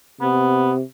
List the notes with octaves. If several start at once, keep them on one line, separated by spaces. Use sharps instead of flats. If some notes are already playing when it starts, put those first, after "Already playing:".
C3 B3